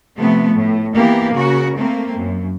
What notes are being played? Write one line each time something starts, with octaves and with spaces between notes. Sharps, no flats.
C3 F3 A3 B3
A2
E3 A#3 B3 G4
C#3 F#4 A#4
A3 A#3 C4
F#2